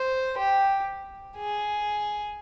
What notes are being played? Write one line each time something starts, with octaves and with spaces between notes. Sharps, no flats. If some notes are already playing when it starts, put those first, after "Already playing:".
Already playing: C5
G4
G#4